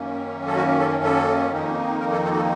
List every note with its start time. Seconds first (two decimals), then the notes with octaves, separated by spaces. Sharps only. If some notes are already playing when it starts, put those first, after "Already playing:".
Already playing: F#2 D#3 A#3 C#4
0.47 A4
0.56 F#4
0.79 A4
1.04 A4
1.52 F2 D#3 A#3 D#4
2.00 A#4
2.12 A4
2.24 A4
2.33 F#4
2.36 A4